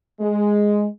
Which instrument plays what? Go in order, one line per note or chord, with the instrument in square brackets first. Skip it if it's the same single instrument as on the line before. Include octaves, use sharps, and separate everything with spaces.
[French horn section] G#3